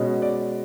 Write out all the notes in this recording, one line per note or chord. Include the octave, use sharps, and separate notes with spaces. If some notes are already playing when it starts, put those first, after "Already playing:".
Already playing: B2 G#3 C#4
D5